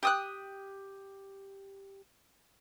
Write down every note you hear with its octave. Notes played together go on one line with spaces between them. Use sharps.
G4 D#6 F#6